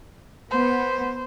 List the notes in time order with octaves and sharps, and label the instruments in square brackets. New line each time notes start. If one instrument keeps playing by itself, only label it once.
[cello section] B3 [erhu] C5